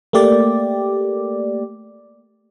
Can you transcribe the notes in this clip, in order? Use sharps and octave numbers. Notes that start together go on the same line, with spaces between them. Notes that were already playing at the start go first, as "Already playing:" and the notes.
A3 A#3 G4 D5